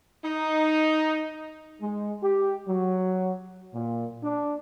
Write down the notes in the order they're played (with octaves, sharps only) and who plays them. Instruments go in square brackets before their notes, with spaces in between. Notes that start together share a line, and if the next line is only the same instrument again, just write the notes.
[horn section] D#4
[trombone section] G#3
G4
F#3
A#2
D4